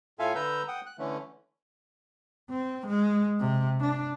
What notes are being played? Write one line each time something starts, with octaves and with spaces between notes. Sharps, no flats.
A2 F4 A4 E5 F5 G#5
D3 B4 A#5 E6 G6
F#5 G5 D#6
F#6
D3 E3 A3 C#4
C4
G#3
C3
D4